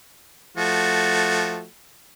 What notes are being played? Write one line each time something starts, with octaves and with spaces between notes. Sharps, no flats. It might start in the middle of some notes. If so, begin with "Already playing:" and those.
F3 A3 F#4